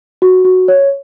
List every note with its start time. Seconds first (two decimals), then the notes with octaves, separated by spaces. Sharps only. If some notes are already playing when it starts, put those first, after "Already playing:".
0.22 F#4
0.45 F#4
0.68 C#5